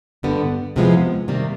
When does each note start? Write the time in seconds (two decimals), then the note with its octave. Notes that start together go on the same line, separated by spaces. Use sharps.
0.23 G2 D3 G3 B3
0.76 E2 C3 F3 G#3 B3
1.28 C3 D#3 G3 A#3